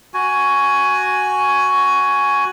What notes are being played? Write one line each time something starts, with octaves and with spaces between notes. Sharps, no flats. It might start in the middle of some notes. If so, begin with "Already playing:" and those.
F#4 G#5